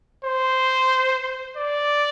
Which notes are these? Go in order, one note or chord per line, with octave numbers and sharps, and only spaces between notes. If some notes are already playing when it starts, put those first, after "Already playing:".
C5
D5